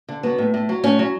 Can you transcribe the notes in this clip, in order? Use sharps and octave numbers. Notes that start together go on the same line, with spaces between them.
D3
F#3 B3
A2
A2
F#3
A2 C#4
F#3